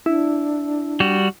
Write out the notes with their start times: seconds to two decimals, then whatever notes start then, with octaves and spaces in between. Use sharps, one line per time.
0.06 D4 E4
1.00 G3 F#4